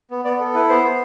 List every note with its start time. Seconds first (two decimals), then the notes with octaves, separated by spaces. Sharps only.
0.11 B3
0.25 B3 D5
0.39 A4
0.54 E4 B4
0.69 B3 C5
0.84 B3